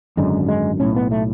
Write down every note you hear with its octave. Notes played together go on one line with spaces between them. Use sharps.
G#1 F#2 D3 G#3
G#3
B1 A2 C#4
B3
A3